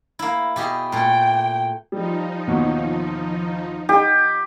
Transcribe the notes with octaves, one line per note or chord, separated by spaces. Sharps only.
A#3 E4
B2 G4 G#4
A#2 A3 G5
F3 G3 D#4
D#2 B2
D#4 G4